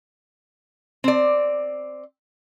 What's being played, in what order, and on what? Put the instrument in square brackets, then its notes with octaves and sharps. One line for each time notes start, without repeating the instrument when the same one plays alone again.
[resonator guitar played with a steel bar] C4 D5